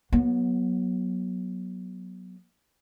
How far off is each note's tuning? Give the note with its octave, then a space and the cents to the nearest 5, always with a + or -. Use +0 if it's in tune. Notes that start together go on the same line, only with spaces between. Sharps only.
F#3 +0 B3 -30